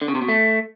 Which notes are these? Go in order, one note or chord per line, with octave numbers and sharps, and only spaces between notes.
D3
C#3
C3
B2
A3